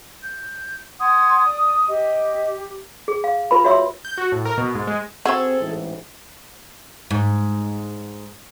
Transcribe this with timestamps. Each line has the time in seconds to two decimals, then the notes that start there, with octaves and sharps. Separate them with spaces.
0.23 G6
1.00 F#5 C6 D#6 G#6
1.46 D5
1.88 G4 D#5
3.08 G#4
3.24 F5
3.51 F4 B4 B5
3.64 F#4 C#5 E5 C6 E6
4.05 G6
4.18 F#4
4.32 A2
4.45 A#4
4.58 B2
4.75 G#2
4.87 G#3
5.25 C4 F#4 G#4 A4 E6
5.60 A1 G#2 E3
7.11 G#2